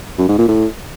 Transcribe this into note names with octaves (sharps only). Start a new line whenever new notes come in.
F#2
G#2
A#2
A2